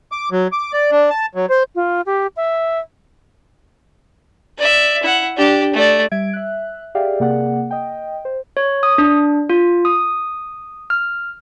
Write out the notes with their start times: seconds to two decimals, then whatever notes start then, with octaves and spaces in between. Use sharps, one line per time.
0.12 D6
0.32 F#3
0.52 D6
0.73 D5
0.92 D4
1.10 A5
1.35 F#3
1.50 C5
1.75 F4
2.06 G4
2.36 E5
4.58 D5 E5
5.03 E4 F#5
5.37 D4 G4
5.74 A3 D5
6.12 G3 E5 G#6 D7
6.33 E5 F#6
6.95 G4 G#4 D5 E5 F5 G5
7.20 C3 A#3 G#4 D5 F#5
7.71 D#5 G5
8.25 C5
8.57 C#5
8.83 D#6
8.98 D4
9.50 F4
9.85 D#6
10.90 F6